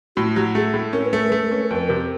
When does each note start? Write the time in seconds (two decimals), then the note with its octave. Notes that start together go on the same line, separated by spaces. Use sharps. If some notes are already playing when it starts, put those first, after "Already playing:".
0.16 A2 F#4
0.35 F#3 G4
0.55 A3 G#4
0.74 A2
0.93 C#4 A#4
1.05 B4
1.13 A3 A#4
1.29 A3 B4
1.40 A#4
1.51 C#4 B4
1.64 A#4
1.70 F2 B4
1.88 C3 A#4